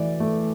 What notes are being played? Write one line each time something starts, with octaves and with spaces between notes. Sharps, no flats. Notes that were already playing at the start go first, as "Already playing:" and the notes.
Already playing: E3 A3 D5
A3